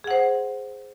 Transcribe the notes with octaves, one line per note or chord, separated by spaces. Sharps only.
G#4 C5 F#5